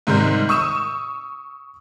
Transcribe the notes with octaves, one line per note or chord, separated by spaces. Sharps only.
G#2 C3 D#3 G3
C#6 D#6 E6 E7